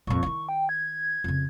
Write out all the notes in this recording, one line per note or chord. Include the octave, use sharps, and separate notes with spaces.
F2 A#2 C#6
D#3 E4
G5
G#6
F2 C#3